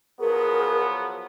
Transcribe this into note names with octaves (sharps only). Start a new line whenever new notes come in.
F3 F#3 B3 G#4 A#4